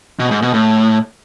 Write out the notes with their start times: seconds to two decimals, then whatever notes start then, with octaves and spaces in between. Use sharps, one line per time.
0.19 B2
0.31 G#2
0.42 B2
0.54 A2